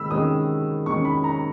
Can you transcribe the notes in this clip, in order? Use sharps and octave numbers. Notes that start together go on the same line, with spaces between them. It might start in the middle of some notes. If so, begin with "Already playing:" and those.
Already playing: C3 D#3 G#3 B5 E6
C3 D#3 G#3 C#4 D#6
C3 D#3 G#3 C#4 C#6
B5
A#5